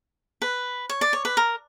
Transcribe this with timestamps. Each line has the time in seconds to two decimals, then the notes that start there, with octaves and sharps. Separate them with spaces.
0.42 B4
0.89 C#5
1.01 D5
1.13 C#5
1.25 B4
1.37 A#4